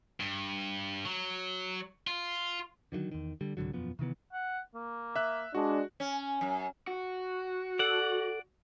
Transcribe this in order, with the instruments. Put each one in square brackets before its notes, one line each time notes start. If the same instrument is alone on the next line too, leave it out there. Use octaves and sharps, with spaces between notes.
[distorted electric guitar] G2
F#3
F4
[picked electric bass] D3 D#3 F3 F#3
E2 D#3
D3 G3
C2 G#2 D3 F#3
E1 F#2 F3 B3
C3 D#3 E3 B3
[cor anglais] F#5
A#3
[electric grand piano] E5 F#6
[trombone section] G#3 D4 [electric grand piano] F#4
[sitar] C#4
F#2
[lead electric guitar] F#4
[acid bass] A4 [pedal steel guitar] D5 F#5